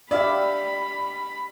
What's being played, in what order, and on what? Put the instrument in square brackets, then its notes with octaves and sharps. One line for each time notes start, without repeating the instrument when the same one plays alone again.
[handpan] D4 G4 [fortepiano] D5 E5 F5 [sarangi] B5